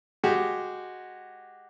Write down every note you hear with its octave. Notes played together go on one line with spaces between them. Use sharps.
G#3 F#4 G4